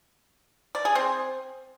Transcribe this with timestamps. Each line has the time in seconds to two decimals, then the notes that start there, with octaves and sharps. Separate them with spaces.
0.75 D5
0.85 G#4
0.95 C4